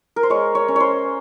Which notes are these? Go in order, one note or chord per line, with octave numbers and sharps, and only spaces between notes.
A#4
C5
G#3 C#5
C#5
C#4
C5 C#5